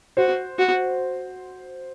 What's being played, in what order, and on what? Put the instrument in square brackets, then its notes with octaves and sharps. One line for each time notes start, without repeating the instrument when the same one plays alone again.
[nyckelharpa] F#4 [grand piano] C5
[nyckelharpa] F#4